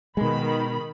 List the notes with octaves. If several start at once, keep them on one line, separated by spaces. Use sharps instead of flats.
B2 D#3 G#3 B5